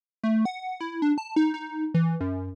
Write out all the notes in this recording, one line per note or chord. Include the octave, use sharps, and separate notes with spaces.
A3
F#5
E4
D4
A5
D#4
D#4
E3
F#2